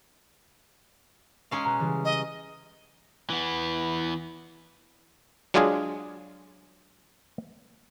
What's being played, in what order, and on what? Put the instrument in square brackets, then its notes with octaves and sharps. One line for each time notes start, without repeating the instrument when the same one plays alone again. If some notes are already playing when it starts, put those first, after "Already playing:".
[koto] G#3 C#4 F5 [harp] G#5 A#5
[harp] B2 F#6 [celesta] A#5
[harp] C#3 E3 G3
[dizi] D#5
[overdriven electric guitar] E3 B3
[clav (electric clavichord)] F#3 G#3 D4 F4 G#4 G#5